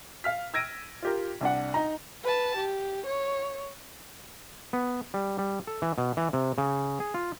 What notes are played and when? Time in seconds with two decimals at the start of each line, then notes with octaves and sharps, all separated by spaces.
0.24 F5 F6 B6
0.54 E6 G#6 A#6 D7 D#7
1.02 F4 G4 A#4
1.41 C2 D4 F#5
1.74 D#4 A#5
2.24 B4 A5
2.56 G4
3.05 C#5
4.73 B3
5.14 G3
5.38 G3
5.67 A4
5.82 E3
5.98 B2
6.17 E3
6.33 C3
6.58 C#3
7.00 G#4
7.14 F4